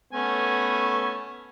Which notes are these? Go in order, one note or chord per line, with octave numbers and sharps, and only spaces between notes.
A3 B3 C#4 G#5